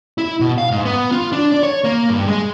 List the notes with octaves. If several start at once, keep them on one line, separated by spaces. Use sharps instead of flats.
E4
B2
F5
G#2
B3
F4
D4
D5
C#5
A#3
G2
G#3